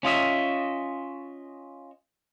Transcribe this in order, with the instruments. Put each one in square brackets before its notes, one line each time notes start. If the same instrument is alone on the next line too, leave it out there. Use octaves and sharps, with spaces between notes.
[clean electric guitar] C#4 F4 D#5 E5